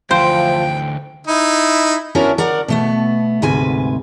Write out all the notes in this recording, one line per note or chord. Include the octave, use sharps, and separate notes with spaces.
D2 E3 F3 C5 G5
D#4 E4
B3 C#4 D4 E4 F#4 A#4
A#4 D5 F#5
B2 A3 B3
D2 G#2 C3 B4 G#5